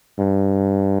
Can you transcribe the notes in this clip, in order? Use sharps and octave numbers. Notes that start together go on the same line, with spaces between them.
G2